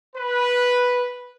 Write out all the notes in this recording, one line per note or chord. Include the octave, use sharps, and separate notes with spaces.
B4